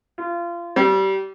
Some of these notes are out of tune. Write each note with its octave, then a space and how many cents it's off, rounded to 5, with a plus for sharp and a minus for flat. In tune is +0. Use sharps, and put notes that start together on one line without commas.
F4 -25
G3 -25